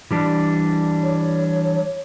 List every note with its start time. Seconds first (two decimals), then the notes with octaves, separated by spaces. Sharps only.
0.11 E3 G3 D4
1.03 C#5